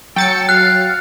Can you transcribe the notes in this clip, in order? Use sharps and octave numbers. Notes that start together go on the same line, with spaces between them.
F#3 A4 G5 A6 C#7
F5 F#6